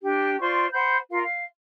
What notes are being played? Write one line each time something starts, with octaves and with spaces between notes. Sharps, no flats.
D4 G4
F4 C5 D5 C#6
C5 F#5 B5 G6
F4 A#4 F5
F5